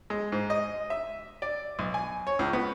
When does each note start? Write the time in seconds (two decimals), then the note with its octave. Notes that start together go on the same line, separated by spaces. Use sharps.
0.10 G#3
0.32 G#2
0.50 D#5
0.90 E5
1.42 D5
1.79 B1
1.94 G#5
2.27 C#5
2.39 C#2
2.53 B3